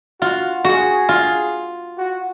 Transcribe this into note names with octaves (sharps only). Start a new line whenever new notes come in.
F4 F#4
F#4 G#4
F4
F#4